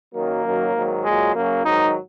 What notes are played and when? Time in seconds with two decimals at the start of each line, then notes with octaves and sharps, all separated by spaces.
0.13 F#2 D#3 F#3 A#3
0.44 F#2 D#3 F#3
0.75 G#2 D#3 F#3
1.04 A#2 F#3 G#3
1.35 F#2 C#3 F#3 A#3
1.65 G#2 D#3 F#3 D#4